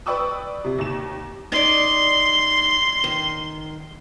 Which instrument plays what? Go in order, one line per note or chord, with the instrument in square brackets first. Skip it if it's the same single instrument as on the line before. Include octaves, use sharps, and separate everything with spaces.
[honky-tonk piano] B4 D5 G5 C#6 D#6 E6
C3
D#2 E7
[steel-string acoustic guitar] D#4 D5 [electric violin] C6
[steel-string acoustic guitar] D#3